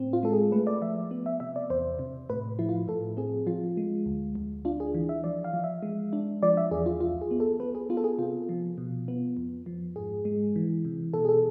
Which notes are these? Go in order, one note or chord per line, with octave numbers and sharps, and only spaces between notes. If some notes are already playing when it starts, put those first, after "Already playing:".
Already playing: A2 C4
F4
G#3 A4
G#4
A3 B4
D5
F3 E5
B3
E5
C3 E5
D5
E2 C5
C3
A2 B4
F3 E4
F4
A2 A4
C4 G#4
F3 F4
G#3
D2
D2
D4 F4
G#4
E3
E5
F3 D5
F5
F3
E5
G#3
D4
F3 D5
E5
E2 G#4
F4
C2 F4
G#4
B3
A4
B3 B4
G#4
B3 F4
A4
G#4
C3 F4
F3
B2
B3
F2
F3
G#2 G#4
G#3
E3
C3
B2 A4
G#4
A4